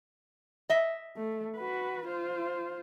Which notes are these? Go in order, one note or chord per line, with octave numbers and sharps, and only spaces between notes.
D#5 E5
A3
F#4 B4
F4 C5